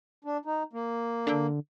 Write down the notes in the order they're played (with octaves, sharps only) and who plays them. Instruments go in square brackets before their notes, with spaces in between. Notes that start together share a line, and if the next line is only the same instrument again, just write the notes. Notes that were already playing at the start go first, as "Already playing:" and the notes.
[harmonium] D4
D#4
A#3
[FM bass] D3